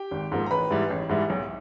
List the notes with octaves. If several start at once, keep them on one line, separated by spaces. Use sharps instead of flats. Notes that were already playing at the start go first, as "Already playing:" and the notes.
Already playing: G4 G5
G#1
G#2 F3 A#3
A#5
A1 B4 B5
G#2 E3 G3
A1
G#2 E3 G3
B1